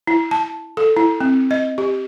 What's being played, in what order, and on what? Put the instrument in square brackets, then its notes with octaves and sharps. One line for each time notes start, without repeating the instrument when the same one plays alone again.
[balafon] E4
A5
A4
E4
C4
D#5
G4